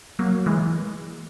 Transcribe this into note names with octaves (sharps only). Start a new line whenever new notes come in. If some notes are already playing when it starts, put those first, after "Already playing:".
F#3 A#3
E3 G#3